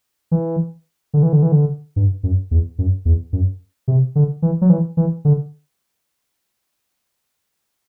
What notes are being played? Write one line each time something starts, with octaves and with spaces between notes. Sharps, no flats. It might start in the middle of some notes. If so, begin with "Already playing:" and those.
E3
D3
E3
D3
E3
D3
G2
F#2
E2
F#2
E2
F#2
C3
D3
E3
F#3
E3
E3
D3